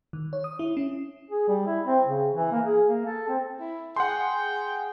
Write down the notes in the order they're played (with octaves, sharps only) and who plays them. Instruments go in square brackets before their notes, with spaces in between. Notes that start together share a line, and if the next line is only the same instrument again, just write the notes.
[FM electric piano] D#3
C#5
D#6
E4
C#4
[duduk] G#4
G3
E4
C4
C#3
E3
A#3
G#4
A#3
A4
C4
[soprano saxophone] E4
[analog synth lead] G#4 [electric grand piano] F#5 C6 [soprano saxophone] G5